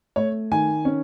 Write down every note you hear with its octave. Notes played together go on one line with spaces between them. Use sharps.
A3 C#5
D#3 G#5
C#4